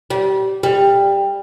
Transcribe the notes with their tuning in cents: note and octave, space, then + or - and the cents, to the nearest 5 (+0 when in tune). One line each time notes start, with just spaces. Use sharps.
G3 -25
G3 +15